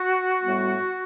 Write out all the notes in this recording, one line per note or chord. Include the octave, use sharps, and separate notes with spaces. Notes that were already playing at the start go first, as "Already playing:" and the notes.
Already playing: F#4
A2 G3 B3